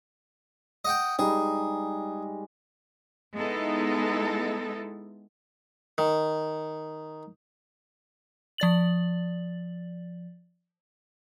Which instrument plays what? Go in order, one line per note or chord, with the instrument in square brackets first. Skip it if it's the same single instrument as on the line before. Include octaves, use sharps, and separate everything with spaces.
[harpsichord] D#5 F#5 G5
[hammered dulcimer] G3 G#3 D#4 [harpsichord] G#4
[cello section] G#3 B3 D#4 E4 A4
[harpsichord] D#3
[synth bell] F3 D5 A6 F#7